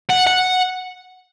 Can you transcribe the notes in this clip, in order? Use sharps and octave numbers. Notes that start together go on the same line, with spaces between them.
F#5
F#5